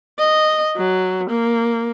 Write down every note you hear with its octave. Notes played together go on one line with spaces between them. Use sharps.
D#5
F#3
A#3